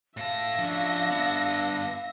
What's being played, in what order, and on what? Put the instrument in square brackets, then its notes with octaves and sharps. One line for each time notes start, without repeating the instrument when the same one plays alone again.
[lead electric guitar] A2 A5 [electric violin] E5 A#6 [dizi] F5
[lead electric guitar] F3 C#4 [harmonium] D4
[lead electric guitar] G2 B3